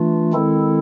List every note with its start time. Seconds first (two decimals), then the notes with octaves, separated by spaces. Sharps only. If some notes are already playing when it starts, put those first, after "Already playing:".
Already playing: E3 A3 D4 F4
0.33 D#3 G#3 C4 E4 A4